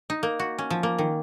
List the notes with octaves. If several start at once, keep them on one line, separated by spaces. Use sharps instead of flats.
D#4
A#3
F#4
C#4
F3
A#3
D#3